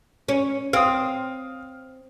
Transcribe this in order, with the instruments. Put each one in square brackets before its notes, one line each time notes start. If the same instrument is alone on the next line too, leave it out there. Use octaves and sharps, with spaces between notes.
[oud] C#4
[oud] C4 [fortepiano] F5 D#6